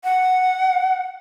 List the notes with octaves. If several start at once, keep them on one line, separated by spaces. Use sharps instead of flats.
F#5